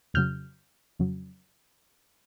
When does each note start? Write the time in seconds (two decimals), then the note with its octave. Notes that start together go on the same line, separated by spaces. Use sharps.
0.14 F2 C#3 F#3 F6 G6
0.99 F2 C#3 F#3